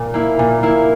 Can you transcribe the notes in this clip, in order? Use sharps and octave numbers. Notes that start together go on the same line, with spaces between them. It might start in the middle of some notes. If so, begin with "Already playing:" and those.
Already playing: A#2
A#3 E4
A#2
A#3 E4